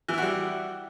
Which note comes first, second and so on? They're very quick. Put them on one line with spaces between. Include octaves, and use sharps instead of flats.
E3 E4 F#4 G3